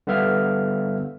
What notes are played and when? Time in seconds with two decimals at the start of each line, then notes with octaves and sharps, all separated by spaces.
0.07 D3 G3 B3 E5 F5 F6